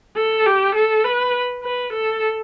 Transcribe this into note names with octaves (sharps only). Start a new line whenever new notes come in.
A4
G4
A4
B4
B4
A4